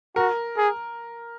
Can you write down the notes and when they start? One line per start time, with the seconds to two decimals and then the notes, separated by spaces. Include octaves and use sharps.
0.16 F#4 A#4
0.57 G#4